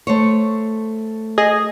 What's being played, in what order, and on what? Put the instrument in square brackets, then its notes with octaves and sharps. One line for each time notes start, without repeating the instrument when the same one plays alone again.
[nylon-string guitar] A3 C5 C#5
[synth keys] G#4 D#5